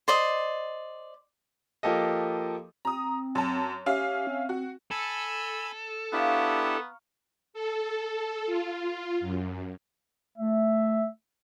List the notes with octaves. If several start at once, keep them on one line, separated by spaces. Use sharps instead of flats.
C5 D5 D#5
F3 A#3 G4 A4 D#5
C4 A#5 D#6
F#2 A5
C#4 G4 E5 F5
C4
F#4
A4 G#5 B5 E6
B3 D4 E4 G4 F5 A#5 C#6
A4
F4
F#2
A3 E5